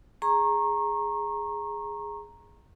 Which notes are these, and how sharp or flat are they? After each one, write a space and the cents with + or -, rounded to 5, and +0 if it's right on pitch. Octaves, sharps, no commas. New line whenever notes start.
G#4 -5 A#5 +0 C#6 -30